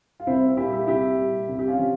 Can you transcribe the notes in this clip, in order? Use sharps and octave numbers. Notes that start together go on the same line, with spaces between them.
F4
C2 C4 E4
A#2 G3 E4 G4
E4 G4
C2 E4 G4
A#2 G3
C2
G4
C#4 F4
C3 F3